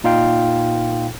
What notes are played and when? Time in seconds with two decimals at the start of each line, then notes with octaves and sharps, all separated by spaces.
0.04 A#2 D#4 F4 F5 G5